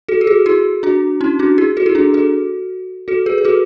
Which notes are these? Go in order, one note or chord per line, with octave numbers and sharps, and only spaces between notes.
F#4 A4
G#4
F#4 A4
E4 G#4
D4 F#4
C#4 E4
D4 F#4
E4 G#4
F#4 A4
E4 G#4
D4 F#4
F#4 A4
F#4 A4
G#4 B4
B4
F#4 A4